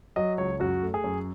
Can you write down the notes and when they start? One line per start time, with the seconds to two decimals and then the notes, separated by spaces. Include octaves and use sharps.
0.16 F#3 D#5
0.38 C#2 C#5
0.60 F#2 F#4
0.82 A3
0.94 G#4
1.04 F#2